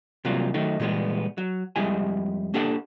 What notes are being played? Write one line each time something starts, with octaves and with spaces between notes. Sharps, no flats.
C3 E3 F#3 G3 A#3 F4
D#3 F#3 A3 D#4
A#2 E3 G3 G#3 B3
F#3
F2 G3 G#3 E4 G4 G#5
A#3 D4 G4 A4 F#5